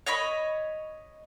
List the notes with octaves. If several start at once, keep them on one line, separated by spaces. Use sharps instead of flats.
C#5 D#5 B5